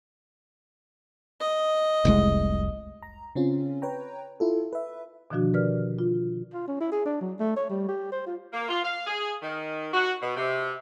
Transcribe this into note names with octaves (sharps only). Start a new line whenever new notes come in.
D#5
F1 C2 G#3
A#5
C#3 C4 C#4 F4
B4 C#5 G5 A#5
E4 F4 A4
B4 E5
B2 D3 D#3 F3 D4 F#4
G4 A#4 B4 D5 F6
F4
F4
C#4
E4
G#4
D4
F#3
A3
C#5
G3
G4
C5
F4
A#3
F4
F5
G#4
D#3
F#4
B2
C3